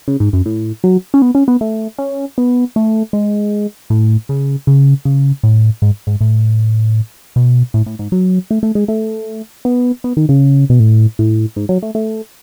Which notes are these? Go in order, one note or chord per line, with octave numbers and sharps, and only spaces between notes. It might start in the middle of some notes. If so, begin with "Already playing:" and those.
C#3
G#2
F#2
A2
F#3
C#4
B3
C#4
B3
A3
C#4
B3
A3
G#3
A2
C#3
C#3
C#3
A2
G#2
G#2
A2
B2
A2
A2
G#2
F#3
A3
A3
G#3
A3
B3
B3
D#3
C#3
B2
A2
A2
G#2
F#3
A3
A3